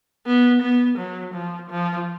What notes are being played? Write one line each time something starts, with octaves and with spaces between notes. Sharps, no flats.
B3
B3
F#3
F3
F3